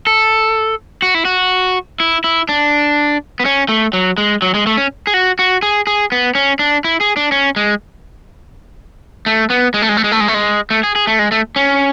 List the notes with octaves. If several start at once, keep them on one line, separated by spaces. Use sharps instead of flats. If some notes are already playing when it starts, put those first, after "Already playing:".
A4
F#4
E4
F#4
E4
E4
D4
B3
C#4
A3
F#3
G#3
F#3
G#3
A3
C#4
G#4
F#4
F#4
G#4
G#4
B3
C#4
D4
E4
G#4
D4
C#4
G#3
A3
B3
G#3
A3
G#3
A3
G#3
A3
G#3
A3
G#3
A3
G#4
G#4
A3
G#3
A3
C#4